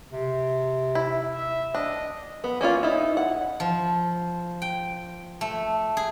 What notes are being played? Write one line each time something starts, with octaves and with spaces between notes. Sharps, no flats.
C3
E4
E5
D4 D#5
B3
A#3 C#4 D#4 F4
D#4 E4
F#5
F3
G5
A3
G#4